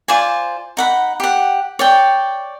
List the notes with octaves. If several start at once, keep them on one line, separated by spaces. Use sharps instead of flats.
F4 C5 D5 G#5
D#4 F#5 B5
G4 F#5
C#5 D5 G5